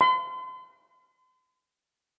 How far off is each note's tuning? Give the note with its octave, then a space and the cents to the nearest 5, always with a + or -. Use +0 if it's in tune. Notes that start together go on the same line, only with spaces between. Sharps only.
C6 -40